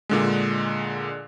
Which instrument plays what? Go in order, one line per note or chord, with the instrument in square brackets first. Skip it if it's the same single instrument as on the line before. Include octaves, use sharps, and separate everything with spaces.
[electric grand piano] A#2 D3 G#3